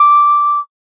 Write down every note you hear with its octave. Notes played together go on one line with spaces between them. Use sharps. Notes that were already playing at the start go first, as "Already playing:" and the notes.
Already playing: D6